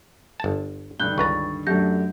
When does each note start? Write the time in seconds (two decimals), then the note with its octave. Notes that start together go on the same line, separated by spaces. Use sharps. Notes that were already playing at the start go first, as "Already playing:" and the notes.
0.40 G1 A5
1.00 G2 D3 D#3 F#6 G6 G7
1.18 C#2 B4 A#5 C#6 A6
1.67 F#2 A3 D4 G4 G6 A#6